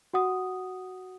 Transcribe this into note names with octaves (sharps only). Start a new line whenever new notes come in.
F#4 F#5 D#6